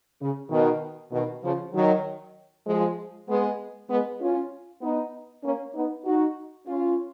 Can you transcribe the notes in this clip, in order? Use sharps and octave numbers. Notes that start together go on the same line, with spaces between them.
C#3
B2 D#3
B2 D#3
C#3 F3
D#3 F#3
F3 G#3
G#3 B3
G#3 B3
C#4 F4
B3 D#4
A#3 C#4
B3 D#4
D#4 F#4
C#4 F4